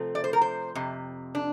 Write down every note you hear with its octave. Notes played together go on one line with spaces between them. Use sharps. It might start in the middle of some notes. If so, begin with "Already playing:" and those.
Already playing: C3 F3 A3 C4
D5
C5
A#4
C5
F2 C3
D4